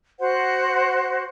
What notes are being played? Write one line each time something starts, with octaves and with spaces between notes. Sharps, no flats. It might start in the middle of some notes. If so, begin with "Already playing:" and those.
F#4 C5 F#5